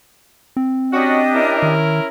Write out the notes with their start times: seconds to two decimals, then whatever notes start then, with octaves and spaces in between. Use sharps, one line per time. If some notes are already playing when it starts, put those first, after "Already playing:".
0.57 C4
0.92 C#4 D4 F#4 G4 D#5
1.34 C#4 E4 A#4
1.63 D#3